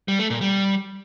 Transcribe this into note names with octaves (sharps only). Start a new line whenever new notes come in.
G3
A3
A#2
G3